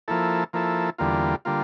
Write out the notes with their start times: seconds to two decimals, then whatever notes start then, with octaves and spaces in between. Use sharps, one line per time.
0.08 F3 A#3 E4 A4
0.53 F3 A#3 E4 A4
0.98 E2 D3 G3 A#3 F4
1.45 D3 G3 A#3 F4